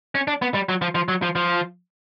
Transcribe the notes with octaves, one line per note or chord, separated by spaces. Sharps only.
C#4
D4
B3
G3
F#3
F3
F3
F#3
F3
F3